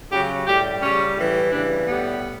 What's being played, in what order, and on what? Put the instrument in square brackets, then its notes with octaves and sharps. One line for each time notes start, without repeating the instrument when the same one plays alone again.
[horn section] C#3 F#3 G4
A2 G3 G4
C#3 G3 C#4
A2 E3 G3
C#3 E3 G3 D4
A2 G3 B3